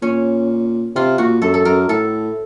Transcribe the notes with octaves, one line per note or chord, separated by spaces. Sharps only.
A#2 C#4
C3 F4
A#2 F#4
F#2 A4
A4
F#2 A#4
A2 A4